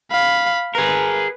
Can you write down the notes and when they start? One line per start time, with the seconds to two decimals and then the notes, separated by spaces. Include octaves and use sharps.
0.11 F5 B5
0.75 G#4 A#4 B4